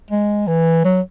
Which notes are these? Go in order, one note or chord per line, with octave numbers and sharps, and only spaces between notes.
G#3
E3
F#3